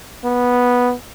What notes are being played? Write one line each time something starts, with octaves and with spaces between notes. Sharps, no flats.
B3